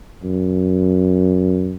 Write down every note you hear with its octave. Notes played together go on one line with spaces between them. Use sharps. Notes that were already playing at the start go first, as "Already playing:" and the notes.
F#2